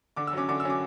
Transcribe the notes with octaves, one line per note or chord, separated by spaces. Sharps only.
D3 D6
E6
F#3 C#4 D6
D3 D6
E6
F#3 C#4 D6